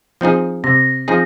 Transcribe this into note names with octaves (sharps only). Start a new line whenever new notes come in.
F3 C4 D#4 G#4
C3 A#6
F3 C4 D#4 G#4